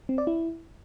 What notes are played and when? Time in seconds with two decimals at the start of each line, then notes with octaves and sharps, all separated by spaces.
0.09 C4
0.18 D5
0.27 E4